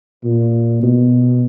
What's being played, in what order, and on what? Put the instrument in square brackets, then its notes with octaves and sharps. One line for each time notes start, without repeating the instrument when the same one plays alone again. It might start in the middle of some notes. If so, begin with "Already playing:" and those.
[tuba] A#2
B2